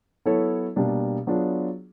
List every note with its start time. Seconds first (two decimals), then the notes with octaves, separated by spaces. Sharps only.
0.25 F#3 B3 E4 A4 C#5
0.76 B2 G3 A#3 D4
1.27 F#3 B3 D4 F4 G#4